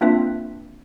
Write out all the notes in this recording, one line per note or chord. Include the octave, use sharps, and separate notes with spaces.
A#3 C4 D4 F4 B4 E5